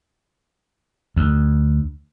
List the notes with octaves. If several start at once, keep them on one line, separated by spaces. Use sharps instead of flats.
D2